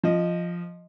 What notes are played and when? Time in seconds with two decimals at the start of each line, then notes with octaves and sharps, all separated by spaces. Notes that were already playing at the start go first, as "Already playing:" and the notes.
0.03 F3 D#5